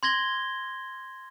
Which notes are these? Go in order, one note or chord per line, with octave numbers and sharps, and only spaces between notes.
C6 G#6 A#6 G7